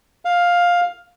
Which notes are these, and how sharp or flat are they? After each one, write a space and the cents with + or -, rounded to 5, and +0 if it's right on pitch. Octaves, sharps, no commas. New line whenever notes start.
F5 +10